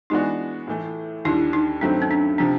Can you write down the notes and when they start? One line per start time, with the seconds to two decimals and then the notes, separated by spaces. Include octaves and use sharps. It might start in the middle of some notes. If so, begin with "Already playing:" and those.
0.10 E3 G#3 B3 D4 D#4 F#4
0.67 A2 E3 A3
1.25 D#2 D3 G3 E4
1.53 D#4
1.81 G2 D#3 F#3 A3 C4 D4
2.02 C#4
2.11 D4
2.38 C3 F3 D4